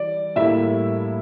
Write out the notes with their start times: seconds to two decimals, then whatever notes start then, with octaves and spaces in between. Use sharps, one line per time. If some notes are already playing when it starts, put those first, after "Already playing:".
Already playing: E3 G3 D5
0.36 A2 G3 A#3 E4 E5